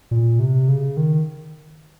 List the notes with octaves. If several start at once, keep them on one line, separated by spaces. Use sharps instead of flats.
A#2
C3
C#3
D#3